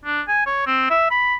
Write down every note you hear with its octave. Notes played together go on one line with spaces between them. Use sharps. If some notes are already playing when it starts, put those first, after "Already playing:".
D4
G#5
C#5
C4
E5
B5